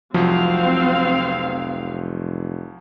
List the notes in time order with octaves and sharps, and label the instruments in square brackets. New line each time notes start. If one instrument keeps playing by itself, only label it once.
[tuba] F1 [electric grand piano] C2 F3 F#3 [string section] C4 F5